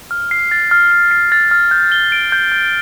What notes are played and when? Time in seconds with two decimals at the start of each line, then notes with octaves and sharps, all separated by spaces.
0.11 F6
0.31 C7
0.51 A6
0.71 F6
0.91 F6
1.11 C7
1.32 A6
1.51 F6
1.71 G6
1.92 G7
2.12 D7
2.32 G6
2.52 G6